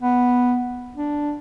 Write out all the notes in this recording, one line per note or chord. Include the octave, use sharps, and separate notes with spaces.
B3
D4